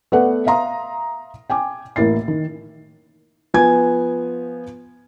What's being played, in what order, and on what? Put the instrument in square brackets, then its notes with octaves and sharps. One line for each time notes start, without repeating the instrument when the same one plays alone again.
[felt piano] A3 B3 A4 B4 D5 F#5
E5 F5 A#5 C6 D#6
G5 G#5 D6
A1 A#3 E4 A6 C7
D#3
F3 B3 G#5 G#6